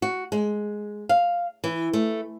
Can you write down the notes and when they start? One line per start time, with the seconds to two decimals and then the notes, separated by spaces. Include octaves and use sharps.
0.02 F#4
0.32 G#3
1.09 F5
1.64 E3
1.93 A3